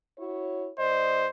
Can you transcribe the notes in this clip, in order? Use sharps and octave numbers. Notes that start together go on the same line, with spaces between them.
E4 F#4 C#5
G2 C5 D5 D#5